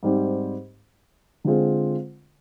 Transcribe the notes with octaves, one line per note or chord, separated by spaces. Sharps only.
G#2 G3 C4
D3 G#3 C4 F4 G#4